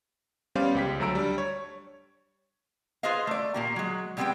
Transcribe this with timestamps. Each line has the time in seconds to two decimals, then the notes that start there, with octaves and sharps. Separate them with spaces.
0.55 G3 B3 C#4 C5 D5 F5
0.75 C#2 G4 B6
1.00 D2 F#3 A3 A#5 E6 D7
1.15 G3 D4
1.38 C#5
3.03 F4 G#4 B4 C5 D#5 F5
3.27 A3 D5
3.54 A#2 A#3 G4
3.76 F#3 G#3
4.17 A#2 G3 G#3 B3 C4 G5